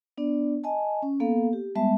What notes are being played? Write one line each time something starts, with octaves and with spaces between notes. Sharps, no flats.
B3 D4 D5
D#5 G#5 A5
C#4
A#3 B3 A4 F5
G4
G3 G#3 B3 E5 A5